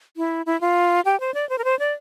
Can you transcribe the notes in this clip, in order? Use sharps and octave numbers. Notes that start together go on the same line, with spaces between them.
E4
E4
F4
G4
C5
D5
C5
A#4
C5
D5